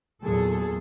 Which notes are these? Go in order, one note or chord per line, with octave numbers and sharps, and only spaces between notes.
E2 A#2 F#3 G#4 A4